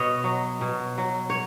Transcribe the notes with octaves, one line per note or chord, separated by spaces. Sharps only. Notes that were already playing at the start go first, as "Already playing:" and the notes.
Already playing: B2 C#5 D#5
F#3
B2
F#3
C#5